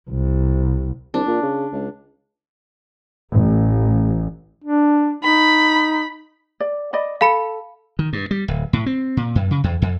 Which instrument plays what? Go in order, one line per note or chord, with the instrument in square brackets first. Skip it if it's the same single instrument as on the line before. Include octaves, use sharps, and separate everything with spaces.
[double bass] C2
[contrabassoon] C2 [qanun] D4
[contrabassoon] A#2
C#3
C#2
[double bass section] A1
[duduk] D4
[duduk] D#4 [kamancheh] B5
[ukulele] D5
D5 D#5 B5
[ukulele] A4 [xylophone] F5 B5 C#7
[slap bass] D#3
G2
G3
D1
A2
C4
A#2
F#2
C#3
E2
F2